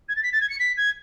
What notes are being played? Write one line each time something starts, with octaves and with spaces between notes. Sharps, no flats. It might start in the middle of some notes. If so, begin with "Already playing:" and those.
G#6
A6
B6
A6
G#6
C#7
B6
G#6